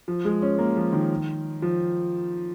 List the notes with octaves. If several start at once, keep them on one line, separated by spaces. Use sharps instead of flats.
F3
G#3
C#4
A#3
F3
D#3
F3